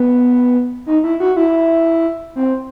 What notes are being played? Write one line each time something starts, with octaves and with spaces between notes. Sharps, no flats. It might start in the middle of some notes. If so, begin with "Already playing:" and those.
Already playing: B3
D#4
E4
F#4
E4
C4